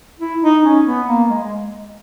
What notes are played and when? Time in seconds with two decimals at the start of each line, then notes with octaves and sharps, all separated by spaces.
0.20 E4
0.42 D#4
0.64 C#4
0.86 B3
1.07 A#3
1.30 G#3
1.43 G#3